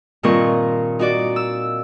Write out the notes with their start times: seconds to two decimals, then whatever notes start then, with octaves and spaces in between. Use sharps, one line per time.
0.23 G2 A#2 D#3 C4 A#4 C#6
0.99 D#4 F#4 D5
1.36 E6